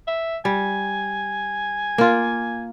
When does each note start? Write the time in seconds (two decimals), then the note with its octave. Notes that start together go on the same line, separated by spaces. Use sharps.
0.08 E5
0.45 G3 G#5
1.98 A#3 F4